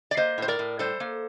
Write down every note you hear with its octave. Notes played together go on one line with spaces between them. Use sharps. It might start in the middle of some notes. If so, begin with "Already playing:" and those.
D5
A#3 C5 D#5
A2 C5
A#4 D5
A2
G3 A4 C5
A#3